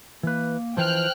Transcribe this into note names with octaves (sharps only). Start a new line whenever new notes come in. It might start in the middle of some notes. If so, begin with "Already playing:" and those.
E3 A#3 B4
E3 F3 C5 G5 F6 F#6